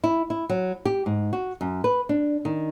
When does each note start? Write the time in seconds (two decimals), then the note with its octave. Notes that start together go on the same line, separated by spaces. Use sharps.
0.04 E4
0.30 E4
0.50 F#3
0.85 G4
1.06 G#2
1.33 F#4
1.61 F#2
1.84 B4
2.09 D4
2.45 D#3